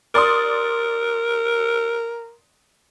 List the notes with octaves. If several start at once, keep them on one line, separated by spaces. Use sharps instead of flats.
A#4 D5 C6 D#6